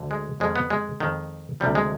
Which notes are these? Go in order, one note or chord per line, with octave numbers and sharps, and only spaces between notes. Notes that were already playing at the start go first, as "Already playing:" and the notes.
Already playing: D2 D3
G#3
F2 D#3 G#3
B3
G#3
F2 D#3
D2 C3 F3 G3
G#3